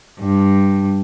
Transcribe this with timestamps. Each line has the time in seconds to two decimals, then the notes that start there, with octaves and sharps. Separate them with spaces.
0.21 G2